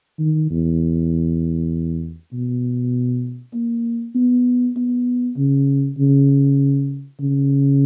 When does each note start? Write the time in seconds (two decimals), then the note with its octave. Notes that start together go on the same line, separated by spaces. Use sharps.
0.19 D#3
0.51 E2
2.33 B2
3.54 A#3
4.15 B3
4.77 B3
5.37 C#3
5.98 C#3
7.20 C#3